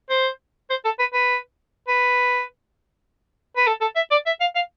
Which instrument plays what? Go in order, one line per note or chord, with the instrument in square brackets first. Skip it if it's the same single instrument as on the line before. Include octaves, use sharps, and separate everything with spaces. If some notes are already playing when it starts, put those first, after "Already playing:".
[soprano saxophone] C5
C5
A4
B4
B4
B4
B4
A4
A4
E5
D5
E5
F5
F5